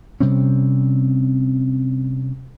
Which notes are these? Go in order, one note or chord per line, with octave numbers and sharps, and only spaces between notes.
C3 G3 C4 C#4